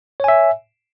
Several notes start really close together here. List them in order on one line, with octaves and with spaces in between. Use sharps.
C#5 G#5 E5